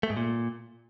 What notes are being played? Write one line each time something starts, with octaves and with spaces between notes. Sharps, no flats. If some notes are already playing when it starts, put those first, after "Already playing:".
A3
G#2
A#2